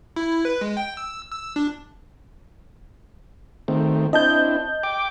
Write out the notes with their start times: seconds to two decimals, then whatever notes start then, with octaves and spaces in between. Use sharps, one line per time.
0.16 E4
0.45 B4
0.61 G#3
0.77 G5
0.97 E6
1.31 E6
1.56 D4
3.68 D#3 A3 C4
4.13 C4 D4 E4 D#5 A5 G6
4.83 G5 D6